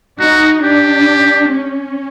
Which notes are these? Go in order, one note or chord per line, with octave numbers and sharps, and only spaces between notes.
D#4 F#4
D4 G4
C#4